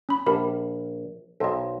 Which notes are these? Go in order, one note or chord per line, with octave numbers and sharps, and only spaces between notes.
C#4 B5
A#1 G4 A#4 B5
B1 A4 C5 D#5